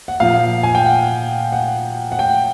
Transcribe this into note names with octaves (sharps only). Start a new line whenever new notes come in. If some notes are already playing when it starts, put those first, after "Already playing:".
F#5
A#2 F3 F5
G#5
G5
F#5
F#5
F#5
G5